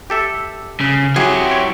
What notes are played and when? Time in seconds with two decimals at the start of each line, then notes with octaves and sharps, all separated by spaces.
0.10 G4 A4 E5
0.81 C#3
1.16 F#3 E4 G4 G#4
1.51 C#5